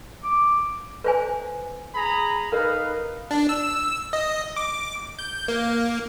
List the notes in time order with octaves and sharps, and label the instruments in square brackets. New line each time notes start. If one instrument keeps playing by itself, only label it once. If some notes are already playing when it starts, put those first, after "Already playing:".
[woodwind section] D6
[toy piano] B4 C5 G#5
[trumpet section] G#4 A#5 B5
[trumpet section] D#4 B4 F5 [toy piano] A#4
[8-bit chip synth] D4
E6
D#5
D6
G6
A#3